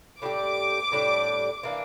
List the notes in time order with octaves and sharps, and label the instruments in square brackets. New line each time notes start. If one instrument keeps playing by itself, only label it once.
[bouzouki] A2 G3 D4 G4 [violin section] D6
[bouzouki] A2 G3 D4 G4
E3 A#3 D4